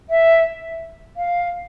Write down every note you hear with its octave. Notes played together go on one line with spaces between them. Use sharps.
E5
F5